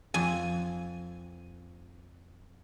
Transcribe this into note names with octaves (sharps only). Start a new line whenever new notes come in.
F2 G#5